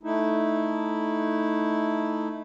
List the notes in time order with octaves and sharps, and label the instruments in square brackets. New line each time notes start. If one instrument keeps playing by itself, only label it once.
[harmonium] A3 D#4 E4